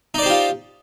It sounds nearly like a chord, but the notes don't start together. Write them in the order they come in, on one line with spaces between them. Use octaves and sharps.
D#4 D5 C5 G4 F4